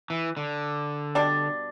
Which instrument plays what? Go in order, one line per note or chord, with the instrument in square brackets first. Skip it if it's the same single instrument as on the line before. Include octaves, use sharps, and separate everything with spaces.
[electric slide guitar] E3
D3
[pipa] B2 G3 D4